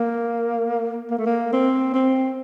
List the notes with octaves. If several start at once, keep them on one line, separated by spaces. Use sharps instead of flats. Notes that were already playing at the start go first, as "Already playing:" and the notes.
Already playing: A#3
A#3
A3
A#3
C4
C4